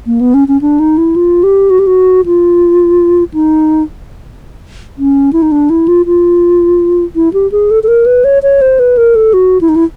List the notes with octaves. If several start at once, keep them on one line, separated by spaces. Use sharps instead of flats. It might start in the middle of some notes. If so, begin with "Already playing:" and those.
A#3
B3
C#4
C#4
D4
D#4
E4
F4
G4
F#4
G4
F#4
F4
D#4
C#4
E4
D#4
D4
E4
F4
F4
E4
G4
G#4
A4
A4
A#4
B4
C#5
C#5
C5
B4
A#4
A4
F#4
E4
D#4
E4